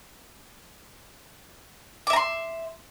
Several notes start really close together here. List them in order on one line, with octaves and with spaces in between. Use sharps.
D6 E5 A#5 C6